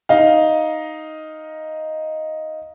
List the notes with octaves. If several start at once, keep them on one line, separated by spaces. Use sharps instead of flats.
D#4 D#5 F5